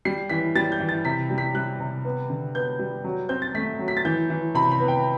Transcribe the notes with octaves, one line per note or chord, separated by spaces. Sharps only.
G3 C7
E3 B6
G3 A6
G6
E3
A6
C3 B6
G3
B6
G3 F#6
C3
B3
D3
B3 G6
G3
F#3
C4 G6
A6
A3 B6
F#3
B6
A6
E3 G6
E3
C3 B5
B5
B3
G5